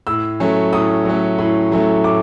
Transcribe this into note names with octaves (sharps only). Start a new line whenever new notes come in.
A2 E6
F#3 A3 C#4
A2 D#6
F#3 A3 C#4
A2
F#3 A3 C#4
A2 D6